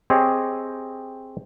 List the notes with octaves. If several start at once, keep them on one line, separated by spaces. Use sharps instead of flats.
C4 G4 G#4 C#5 D#5